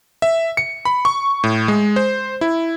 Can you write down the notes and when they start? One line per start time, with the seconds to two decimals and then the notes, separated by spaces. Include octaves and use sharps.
0.22 E5
0.57 C#7
0.85 B5
1.05 C#6
1.44 A2
1.68 G#3
1.96 C5
2.41 E4